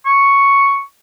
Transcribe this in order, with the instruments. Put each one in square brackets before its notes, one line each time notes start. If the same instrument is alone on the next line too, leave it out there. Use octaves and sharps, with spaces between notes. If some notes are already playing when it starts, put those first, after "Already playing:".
[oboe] C#6